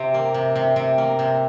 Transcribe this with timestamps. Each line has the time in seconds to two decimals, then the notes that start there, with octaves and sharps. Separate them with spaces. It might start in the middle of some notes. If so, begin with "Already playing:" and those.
Already playing: C3 G4
0.14 A#3
0.34 C3
0.55 C3
0.76 C3
0.98 A#3
1.19 C3